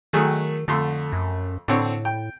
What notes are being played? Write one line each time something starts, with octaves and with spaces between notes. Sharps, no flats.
D#3 F#3 A3 G#4
F2 D3 A3 C6
F#2
A2 D3 C4 C#5
G5